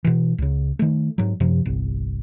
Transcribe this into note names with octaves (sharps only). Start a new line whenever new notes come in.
B2 E3
C#2 C#3
D#3 A3
G#2 F#3
F#2 C3 F3
G1 C2